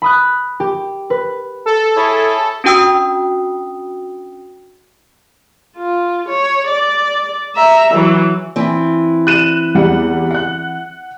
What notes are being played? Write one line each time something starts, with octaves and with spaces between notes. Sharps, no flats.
B5 D#6 F#6
G4
B4
A4
E4 G#4 C#5
C#4 D4 F#4 G5 D#6 E6
F4
C#5
D5
E5 A#5
E3 F#3
E3 C4
F#6 D#7 E7
E2 G3 F#5
F#5 F#6